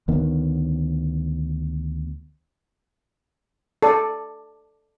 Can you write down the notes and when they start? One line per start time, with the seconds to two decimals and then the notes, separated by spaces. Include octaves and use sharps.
0.08 D2 D#3 B3
3.83 A4 D5